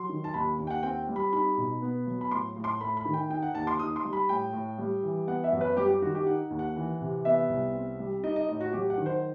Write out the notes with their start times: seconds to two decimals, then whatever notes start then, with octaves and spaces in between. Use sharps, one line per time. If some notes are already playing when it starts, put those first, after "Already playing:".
Already playing: F#3 C6
0.09 D#3
0.24 A5
0.34 D#2 B5
0.59 D#2
0.67 G5
0.70 F#5
0.83 C4 G5
1.08 G3
1.16 B5
1.33 D#4 B5
1.57 B2
1.82 B3
2.06 F#3
2.21 B5
2.31 A2 C6
2.56 A2
2.64 C6
2.81 A3 B5
2.97 B5
3.05 D#3
3.14 G5
3.30 D#4 G5
3.42 F#5
3.55 D#2 A5
3.67 C6
3.79 D#4 D#6
3.96 C6
4.05 G3
4.13 B5
4.29 A2 G5
4.53 A2
4.78 G3
5.03 E3
5.27 B3 F#5
5.44 E5
5.52 F#2
5.61 B4
5.77 G3 G4
5.89 G4
6.02 D#3 F#4
6.15 G4
6.27 D#4 F#5
6.50 D#2
6.59 F#5
6.76 E3
7.01 C3
7.25 B3 E5
7.49 C2
7.75 C4
7.99 G3
8.24 D#4 D#5
8.36 D#5
8.49 A2 D#5
8.60 F#4
8.73 F#3 G4
8.90 F#5
8.98 D#3
9.06 C5